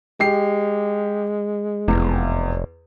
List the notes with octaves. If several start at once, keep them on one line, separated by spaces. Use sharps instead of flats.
G#3 G4 C7
F1 E2